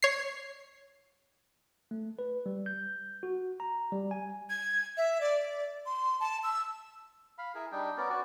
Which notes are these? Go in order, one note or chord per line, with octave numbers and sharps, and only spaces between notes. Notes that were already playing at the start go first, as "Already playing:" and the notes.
C#5 C7
A3
B4
G3
G6
F#4
A#5
G3
G#5
G#6
E5
D5
C6
A5
E6
F5 B5
E4 G#4 A#4
G3 D4 D#4 G5
B3 C#4 A#4 D5
F#4 D5